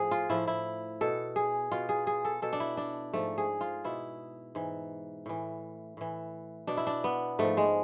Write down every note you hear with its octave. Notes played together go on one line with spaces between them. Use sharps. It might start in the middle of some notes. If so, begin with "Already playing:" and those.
Already playing: A2 F3 G#4
F4
A2 F3 E4
E4
B2 A4
G#4
B2 F4
G#4
G#4
A4
B2 A4
D4
E4
D4
G#2 F3 A3
G#4
F4
B2 E4
G#2 E3
A2 E3
A2 E3
B2 D4
E4
D4
B3
G#2 F3 A3
G#3